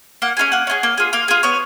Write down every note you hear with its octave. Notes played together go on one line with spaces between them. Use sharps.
A#3 F#5
C#4 F4 G#4 G#5
A#3 F#5
C#4 F4 G#4
A#3
F4 G#4
A#3 F5
F4 G#4
B3 C#5